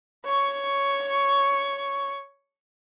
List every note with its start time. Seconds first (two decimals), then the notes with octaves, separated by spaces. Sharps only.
0.25 C#5 C#6